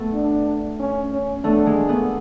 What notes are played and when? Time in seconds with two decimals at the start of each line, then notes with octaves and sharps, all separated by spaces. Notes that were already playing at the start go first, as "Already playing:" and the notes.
Already playing: A3 B3
0.13 D4
0.80 C#4
1.12 C#4
1.44 A3 B3 D4
1.66 G#3 A#3
1.88 A3 B3